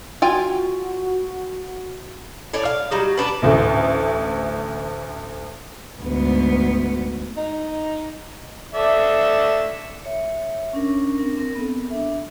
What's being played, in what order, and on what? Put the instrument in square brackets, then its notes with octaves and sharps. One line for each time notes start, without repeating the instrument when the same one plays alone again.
[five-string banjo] F4 G5 G#5 [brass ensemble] F#4
[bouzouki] A2 C#5 D5 G#5
F5
F#3 G3 D#4
B3 D4 B4
[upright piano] A1 D2 A2
[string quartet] D2 G#2 B3
[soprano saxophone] D#4
[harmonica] A4 D5 E5
[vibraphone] C#5 E5
C#4 D4 A#4
C4 D4 A#4
C4 A#4
B3 A4
D4 E5